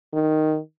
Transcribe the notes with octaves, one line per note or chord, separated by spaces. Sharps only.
D#3